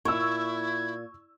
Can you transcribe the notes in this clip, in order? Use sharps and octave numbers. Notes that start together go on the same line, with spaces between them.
A#2 E4 C#6 E6 G#6